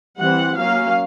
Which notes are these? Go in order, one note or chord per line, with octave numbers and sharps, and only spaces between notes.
E3 G3 C4 F#5
F#3 A#3 C#4 F5